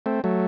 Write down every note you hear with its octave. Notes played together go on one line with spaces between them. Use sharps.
A3 C4
F#3 A3